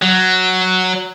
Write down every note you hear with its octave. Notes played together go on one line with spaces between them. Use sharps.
F#3